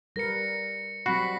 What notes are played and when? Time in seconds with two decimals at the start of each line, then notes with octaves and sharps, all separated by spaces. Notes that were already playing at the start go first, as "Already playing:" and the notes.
0.16 G3 A#4 B4 A#6 C#7
1.06 F#3 G3 C4 F#4 B5 B6 C7